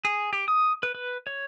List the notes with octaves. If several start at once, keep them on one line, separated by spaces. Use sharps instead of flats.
G#4
G4
D#6
B4
B4
C#5